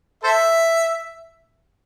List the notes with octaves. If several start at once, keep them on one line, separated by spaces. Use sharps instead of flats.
A4 C5 E5